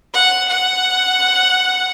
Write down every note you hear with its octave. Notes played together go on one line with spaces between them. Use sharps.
F#5
F#5